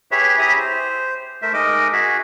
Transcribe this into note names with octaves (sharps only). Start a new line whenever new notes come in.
G4 G#4 B4 C#5 E5
E4 G4 G#4 E5 A#5 D#6
C5
A3 A#4 C5 E5
G#3 D#4 A#4 D#5 D6
F#4 G#4 E5